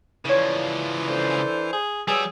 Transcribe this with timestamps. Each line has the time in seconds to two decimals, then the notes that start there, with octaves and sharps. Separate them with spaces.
0.25 C#3 E3 F3 C#5 D5
1.08 D4 A4 C5
1.73 G#4
2.08 B2 G3 G#4 C#5 E6